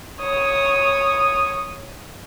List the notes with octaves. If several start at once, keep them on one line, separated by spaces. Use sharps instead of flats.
C#5 D#6